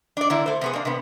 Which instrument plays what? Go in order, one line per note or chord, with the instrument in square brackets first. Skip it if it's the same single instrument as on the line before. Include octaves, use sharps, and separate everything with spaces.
[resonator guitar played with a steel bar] D4 D5
D3 A#3 D4 E4
A3 C5
C3 B3 G#4
A#3 D4
C3 B3